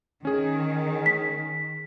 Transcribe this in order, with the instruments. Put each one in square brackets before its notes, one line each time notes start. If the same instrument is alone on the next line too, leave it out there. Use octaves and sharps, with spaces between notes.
[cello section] D#3 [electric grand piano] C#4 G#4
[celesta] B6